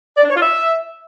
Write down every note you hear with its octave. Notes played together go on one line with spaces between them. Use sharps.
D5
D4
C#5
F4
E5